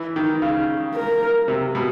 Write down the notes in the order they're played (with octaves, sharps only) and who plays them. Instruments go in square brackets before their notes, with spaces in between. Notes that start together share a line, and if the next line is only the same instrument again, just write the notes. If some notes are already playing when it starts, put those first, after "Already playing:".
Already playing: [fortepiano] E3
D#3
C#3
[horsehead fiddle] A#4
[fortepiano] C3
B2